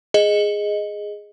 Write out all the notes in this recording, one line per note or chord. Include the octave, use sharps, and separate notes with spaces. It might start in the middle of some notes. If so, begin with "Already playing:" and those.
G#4 D#5